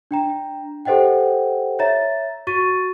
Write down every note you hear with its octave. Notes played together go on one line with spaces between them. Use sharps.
D4 G5 A#5
G4 A4 C5 D#5 F#5 G5
C#5 E5 A#5 A6
F#4 C#6 A6 D#7